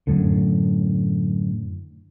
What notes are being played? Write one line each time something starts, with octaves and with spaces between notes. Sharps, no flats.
F#2 A2 D3